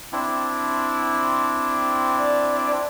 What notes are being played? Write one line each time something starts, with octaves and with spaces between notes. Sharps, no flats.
C4 D4 E4
D5